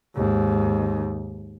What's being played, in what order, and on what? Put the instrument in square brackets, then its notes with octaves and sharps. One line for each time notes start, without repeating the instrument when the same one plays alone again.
[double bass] D#2 G#2